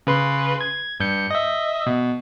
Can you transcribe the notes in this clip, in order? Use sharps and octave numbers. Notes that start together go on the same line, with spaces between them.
C#3 B4 C6
G#6
G2 G6 C#7
D#5 E5
B2